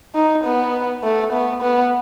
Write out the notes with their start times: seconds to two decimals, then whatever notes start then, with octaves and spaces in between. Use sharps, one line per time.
0.15 D#4
0.44 B3
1.04 A3
1.33 B3
1.62 B3